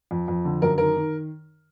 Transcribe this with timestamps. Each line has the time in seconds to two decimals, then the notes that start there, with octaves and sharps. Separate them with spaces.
0.11 F2
0.28 F2
0.45 D3
0.62 F#2 A#4
0.78 D#3 A#4
0.96 D#3